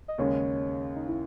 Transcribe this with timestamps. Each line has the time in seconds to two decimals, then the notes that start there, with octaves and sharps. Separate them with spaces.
0.08 D#5
0.18 D#2 C#3 G#3 C#4 C#5
0.96 D#4
1.08 E4